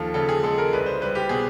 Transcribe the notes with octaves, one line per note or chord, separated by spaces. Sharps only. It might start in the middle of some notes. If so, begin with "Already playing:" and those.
Already playing: D#2 F3 A4
C#3 A4
G#4
G#3 A4
A#4
C2 B4
C5
G3 B4
G4
B2 G#4